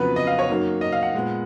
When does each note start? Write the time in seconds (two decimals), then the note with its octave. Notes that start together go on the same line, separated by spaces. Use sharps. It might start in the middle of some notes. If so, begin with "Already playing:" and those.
Already playing: F2 C#3 F#3 B3 B4
0.16 D#5
0.27 F5
0.39 C#5
0.50 F#2 D#3 F#3 A#3
0.81 D#5
0.92 F5
1.03 F#5
1.14 A#2 G#3 B3